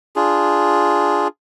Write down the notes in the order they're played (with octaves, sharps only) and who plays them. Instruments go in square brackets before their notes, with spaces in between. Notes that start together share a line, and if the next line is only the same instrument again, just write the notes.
[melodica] D4 F4 G#4